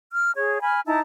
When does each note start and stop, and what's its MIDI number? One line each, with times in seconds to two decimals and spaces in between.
0.12 0.30 89
0.35 0.60 68
0.35 0.60 73
0.62 0.80 80
0.62 0.80 83
0.62 0.80 89
0.86 1.00 63
0.86 1.00 64
0.86 1.00 81
0.86 1.00 82